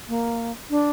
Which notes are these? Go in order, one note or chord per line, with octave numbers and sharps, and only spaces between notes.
A#3
D4